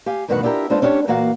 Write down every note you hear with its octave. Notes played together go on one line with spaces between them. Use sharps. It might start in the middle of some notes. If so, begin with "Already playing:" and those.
G4 F5 G#5
D2 G2 B2 D#3 B4 F#5
D4 E4 F4 G4 A#4
G#3 B3 D4 F4 C5
C#4 D4 E4 G4 C#5
A#2 E3 A#3 F#4 F5 F#5